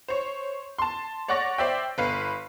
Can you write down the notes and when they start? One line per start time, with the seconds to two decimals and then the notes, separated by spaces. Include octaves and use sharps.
0.08 C5 C#5
0.78 A5 C6
1.28 C#5 D5 F#5 C#6 A6 A#6
1.58 C5 D5 E5 G5
1.98 G1 B4 F5 C7